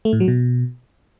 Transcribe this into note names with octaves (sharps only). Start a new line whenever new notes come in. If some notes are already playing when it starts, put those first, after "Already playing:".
A3
A2
F#3
B2